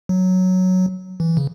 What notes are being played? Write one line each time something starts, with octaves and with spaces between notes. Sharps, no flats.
F#3
E3
C#3